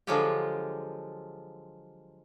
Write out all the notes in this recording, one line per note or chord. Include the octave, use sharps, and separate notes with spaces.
D3 F3 F#3 G#3 F4 G4